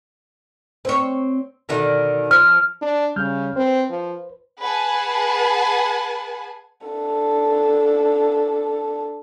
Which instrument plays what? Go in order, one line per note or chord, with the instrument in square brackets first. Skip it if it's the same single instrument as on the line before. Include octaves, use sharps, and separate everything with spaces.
[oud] C4 C#5
B2 D3 D#3
[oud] F3 [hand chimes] F6
[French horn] D4
[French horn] C#3 [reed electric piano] G3 F6 G6
[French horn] C4 [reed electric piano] B4 C5
[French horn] F3
[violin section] G#4 B4 F#5 G#5 A5
[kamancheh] D4 A4